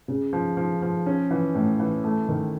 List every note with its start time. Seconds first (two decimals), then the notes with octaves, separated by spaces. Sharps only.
0.08 C#3
0.33 F3
0.57 F3
0.82 F3
1.06 C#4
1.30 E3
1.55 A2
1.80 E3
2.04 A3
2.29 D#3